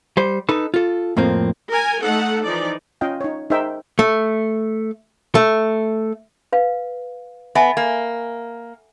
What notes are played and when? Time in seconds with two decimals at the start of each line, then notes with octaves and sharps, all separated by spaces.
0.17 G3 C5
0.49 D#4 A4 B4
0.74 F4 A4
1.17 F2 A2 F3 A#3 C4
1.72 A#4 G#5
2.02 A3 D#4 A4 F#5
2.44 E3 F3 D#4 D5
3.01 C#4 F4 D#5 F5 G5
3.21 D#4 C#5
3.50 D#4 G#4 A#4 C5 E5 G5
3.99 A3
5.35 A3
6.53 B4 F5
7.55 B3 E5 G#5 A5
7.77 A#3